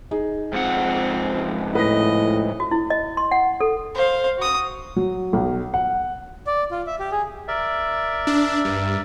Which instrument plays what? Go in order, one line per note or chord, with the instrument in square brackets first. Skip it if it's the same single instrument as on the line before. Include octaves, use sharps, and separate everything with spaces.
[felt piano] D#4 G#4
[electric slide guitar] G#2 F3 F#5 [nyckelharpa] C4
[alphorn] A2 [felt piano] B4 A#6 [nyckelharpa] D#5
[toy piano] F#4
E4
D#5
C6
F#5
A4
[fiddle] C5 F5
F#4 D#6
[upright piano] F#3
B1
F#5
[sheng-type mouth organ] D5
F4
E5
G4
G#4
[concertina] A#4 D5 E5
[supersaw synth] D4
G2